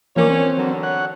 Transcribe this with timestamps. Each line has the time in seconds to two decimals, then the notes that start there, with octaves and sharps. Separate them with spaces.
0.16 E3 F3 A#3 C#4 D4 A#4 C#5 D6
0.30 C4
0.57 D3 D#3 F#3
0.83 C#5 F#5